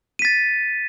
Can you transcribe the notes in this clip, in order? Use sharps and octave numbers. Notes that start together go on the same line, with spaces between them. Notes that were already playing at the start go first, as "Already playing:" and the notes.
A6 B6 D#7